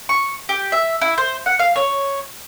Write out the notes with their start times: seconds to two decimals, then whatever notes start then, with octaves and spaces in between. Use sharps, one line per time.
0.09 C#6
0.49 G4
0.72 E5
1.01 E4
1.18 C5
1.46 F#5
1.59 F5
1.76 C#5